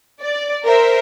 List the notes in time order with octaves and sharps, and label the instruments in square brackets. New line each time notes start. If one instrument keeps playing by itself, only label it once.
[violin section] D5
A#4 C5 E5